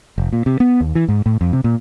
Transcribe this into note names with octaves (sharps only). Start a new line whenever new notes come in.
F1
A#2
C3
B3
D#2
E3
G#2
A2
F2
C3
A#2